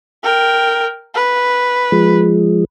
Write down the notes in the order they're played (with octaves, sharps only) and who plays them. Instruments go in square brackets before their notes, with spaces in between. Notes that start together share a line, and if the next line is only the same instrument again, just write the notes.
[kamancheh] A#4 G5
B4
[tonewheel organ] F3 G#3